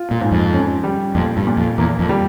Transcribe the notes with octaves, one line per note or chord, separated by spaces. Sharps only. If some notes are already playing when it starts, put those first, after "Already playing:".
Already playing: F4
A#2
G#2
F2
C#4
G3
F2 A#2
G2
A#2
F2
E2 A#3
F2
G3